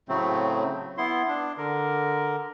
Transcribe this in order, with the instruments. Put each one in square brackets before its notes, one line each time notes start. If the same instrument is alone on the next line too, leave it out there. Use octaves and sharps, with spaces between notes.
[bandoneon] A2 C#3 F#3 A3 C4
B3 E4 C6
D4
D3 A#4